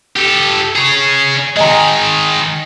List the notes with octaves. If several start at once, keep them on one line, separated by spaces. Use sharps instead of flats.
G4 A4
G#4 C#5
D#3 G#3 D#5 G#5 A#5